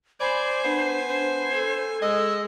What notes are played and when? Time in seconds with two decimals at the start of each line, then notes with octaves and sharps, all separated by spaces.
0.20 C5 D5 G#5 B5
0.64 B3 D4
1.08 D4 C5
1.53 A4
2.02 G#3 D#5 E6